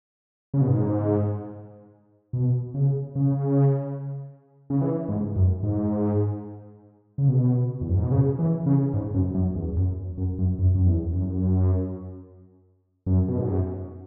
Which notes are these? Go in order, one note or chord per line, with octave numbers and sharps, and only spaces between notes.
C#3
B2
G#2
B2
C#3
C#3
C#3
E3
G#2
F#2
G#2
C#3
B2
E2
F#2
G#2
B2
C#3
E3
C#3
G#2
F#2
F#2
E2
F#2
F#2
F#2
F#2
F#2
E2
F#2
F#2
B2
G#2
F#2